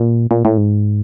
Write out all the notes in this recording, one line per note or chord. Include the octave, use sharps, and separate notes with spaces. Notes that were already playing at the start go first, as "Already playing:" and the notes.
Already playing: A#2
A#2
A2
G#2